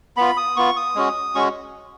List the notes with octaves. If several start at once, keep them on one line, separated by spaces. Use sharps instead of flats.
B3 F4 B5
D#6
B3 F4 C#6
D#6
G#3 C#4 F#4
G#3 C#4 F#4 C#6